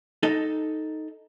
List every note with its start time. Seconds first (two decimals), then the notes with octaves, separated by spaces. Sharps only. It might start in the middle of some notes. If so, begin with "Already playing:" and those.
0.23 D#4 A4 D#5